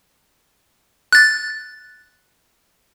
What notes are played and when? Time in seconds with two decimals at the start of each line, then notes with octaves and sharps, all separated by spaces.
1.12 F#6 A6